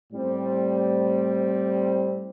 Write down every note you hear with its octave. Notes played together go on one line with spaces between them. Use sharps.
A2 G3 C4